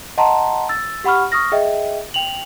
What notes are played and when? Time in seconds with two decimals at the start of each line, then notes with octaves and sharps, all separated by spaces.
0.18 D#5 F#5 A5 A#5 C6
0.69 E6 A6
1.04 G4 F#5 B5 C#6 F6
1.32 C#6 D#6 F6 A#6
1.52 G#4 D#5 E5 G5
2.14 G5 F7 F#7